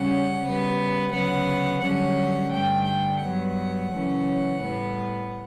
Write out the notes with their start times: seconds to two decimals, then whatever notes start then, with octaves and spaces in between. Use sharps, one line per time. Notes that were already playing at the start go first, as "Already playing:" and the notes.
Already playing: C#3 G3 C#4 F#5
0.41 C#3 G3 B3
1.11 D2 C#3 F#3 B3 F#5
1.80 F#2 D3 G3 C#4 F#5
2.50 G2 D3 A3 G5
2.85 G5
3.20 G2 F#3 B3 F#5
3.90 F#2 C#3 E3 A3 C#4
4.59 A2 G3 B3